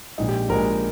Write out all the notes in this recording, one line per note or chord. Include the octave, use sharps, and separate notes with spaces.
A#1 A#2 G#3 D#4
G4
A#1 A#2 G#3 A#4